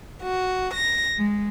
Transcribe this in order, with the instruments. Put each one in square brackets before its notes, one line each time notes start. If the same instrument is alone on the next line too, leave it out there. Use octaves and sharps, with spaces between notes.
[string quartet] F#4
A#6
G#3